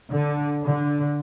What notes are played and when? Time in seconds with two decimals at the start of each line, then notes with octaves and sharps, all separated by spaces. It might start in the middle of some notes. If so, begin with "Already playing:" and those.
0.12 D3
0.65 D3